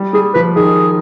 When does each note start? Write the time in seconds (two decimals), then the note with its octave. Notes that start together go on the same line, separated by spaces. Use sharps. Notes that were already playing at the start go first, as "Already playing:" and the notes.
Already playing: G3
0.13 G3 G#4
0.34 F3 B4
0.56 D#3 G#4